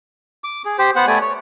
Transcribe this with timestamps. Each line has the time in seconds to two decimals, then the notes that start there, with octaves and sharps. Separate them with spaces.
0.44 D6
0.65 G#4
0.78 G4 C5
0.96 B3 C5 F#5
1.07 A3 B3 D5 G#5
1.21 C#5